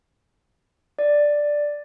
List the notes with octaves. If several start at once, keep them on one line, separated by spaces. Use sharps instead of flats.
D5